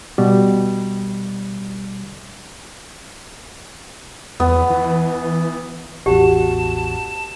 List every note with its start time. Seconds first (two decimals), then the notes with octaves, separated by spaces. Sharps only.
0.18 B2 G3
4.40 E2 B3
4.70 E3
6.06 A1 E2 F#4 G4 A5